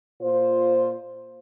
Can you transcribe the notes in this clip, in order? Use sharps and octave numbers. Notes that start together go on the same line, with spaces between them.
A#2 F4 C5